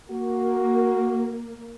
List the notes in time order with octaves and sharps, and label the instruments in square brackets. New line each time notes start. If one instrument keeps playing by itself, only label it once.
[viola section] A#3 [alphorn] F#4